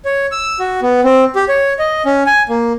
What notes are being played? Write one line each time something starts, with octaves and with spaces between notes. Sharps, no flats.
C#5
E6
F#4
B3
C4
G4
C#5
D#5
C#4
G#5
A#3